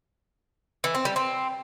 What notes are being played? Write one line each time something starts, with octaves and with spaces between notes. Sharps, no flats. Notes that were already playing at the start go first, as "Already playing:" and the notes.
E3
C4
G3
C4